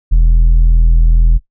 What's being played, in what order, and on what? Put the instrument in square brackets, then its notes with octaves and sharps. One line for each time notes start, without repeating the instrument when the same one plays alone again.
[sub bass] E1